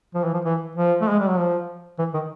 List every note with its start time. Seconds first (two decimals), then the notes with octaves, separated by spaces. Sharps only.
0.15 F3
0.24 E3
0.33 F3
0.45 E3
0.75 F3
1.01 A3
1.10 G#3
1.19 G3
1.28 F#3
1.38 F3
1.99 E3
2.14 D#3